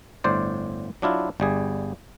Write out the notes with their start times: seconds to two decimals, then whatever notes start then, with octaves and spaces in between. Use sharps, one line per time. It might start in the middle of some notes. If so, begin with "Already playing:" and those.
0.24 G1 A2 C5 D5
1.02 F#3 D4 E4 F4
1.40 G1 G3 G#4